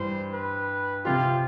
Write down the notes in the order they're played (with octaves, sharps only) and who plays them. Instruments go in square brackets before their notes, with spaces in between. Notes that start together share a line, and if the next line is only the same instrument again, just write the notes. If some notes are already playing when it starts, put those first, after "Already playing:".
Already playing: [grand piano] G2 E3 G3 [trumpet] C5
[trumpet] B4
[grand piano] C3 F3 C4 G4 [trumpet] F4